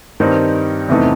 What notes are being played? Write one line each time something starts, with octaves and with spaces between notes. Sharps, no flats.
G2 D#3 G3 C4 D#4
E2 C3 E3 A3 D#4